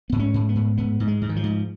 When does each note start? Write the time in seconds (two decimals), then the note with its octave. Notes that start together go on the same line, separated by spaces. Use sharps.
0.10 G#2 B3
0.19 C#4
0.34 G#2
0.49 B3
0.56 G#2
0.78 G#2 B3
1.00 G#2
1.07 G#3
1.22 G#2
1.29 D#3
1.36 F3
1.44 G#2